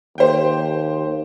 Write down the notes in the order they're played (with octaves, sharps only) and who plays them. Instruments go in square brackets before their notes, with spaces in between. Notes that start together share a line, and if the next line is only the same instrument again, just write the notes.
[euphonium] D#2 [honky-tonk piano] G4 C5 G5